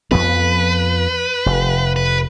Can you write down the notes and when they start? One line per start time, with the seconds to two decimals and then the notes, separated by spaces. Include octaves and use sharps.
0.11 F2 F3 B3 B4
1.46 F1
1.96 B4